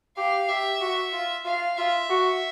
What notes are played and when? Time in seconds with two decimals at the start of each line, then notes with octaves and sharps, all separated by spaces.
0.17 G4 F5
0.49 G4 E5
0.81 F#4
1.13 F4
1.45 F4 F5
1.77 F4 E5
2.10 F#4